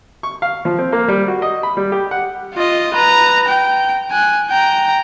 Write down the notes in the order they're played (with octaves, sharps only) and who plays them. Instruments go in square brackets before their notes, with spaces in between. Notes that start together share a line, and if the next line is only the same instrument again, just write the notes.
[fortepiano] C#6
F5
F3
C4
A#3
G3
F#4
D#5
B5
G3
G4
F#5
[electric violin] F4 D#5
B4 A#5
G5
G#5 F#6
G5 A#5